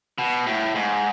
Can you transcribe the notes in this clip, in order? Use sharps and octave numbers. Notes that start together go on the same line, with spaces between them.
B2
A2
G#2